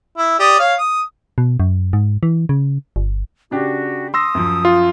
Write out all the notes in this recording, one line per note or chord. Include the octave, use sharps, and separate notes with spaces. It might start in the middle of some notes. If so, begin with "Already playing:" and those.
E4
G4 D5 D#6
C#5 F5
D#6
B2
F#2
G#2
E3
C#3
G1
C#3 D4 F#4 G4
C6 D#6 E6 A#6
F#2 F3
F4